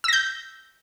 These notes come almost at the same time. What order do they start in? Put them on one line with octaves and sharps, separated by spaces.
E6 A#6 G6